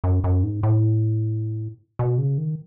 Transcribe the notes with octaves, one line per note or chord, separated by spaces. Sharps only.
F#2
F#2
G#2
A2
B2
C#3
D#3